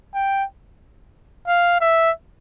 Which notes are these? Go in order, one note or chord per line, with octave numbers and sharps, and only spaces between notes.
G5
F5
E5